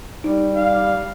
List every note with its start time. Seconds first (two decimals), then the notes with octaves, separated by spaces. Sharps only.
0.24 G3 D#4
0.56 F5